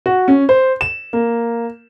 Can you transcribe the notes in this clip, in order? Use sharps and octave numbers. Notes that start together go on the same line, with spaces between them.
F#4
C#4
C5
E7
A#3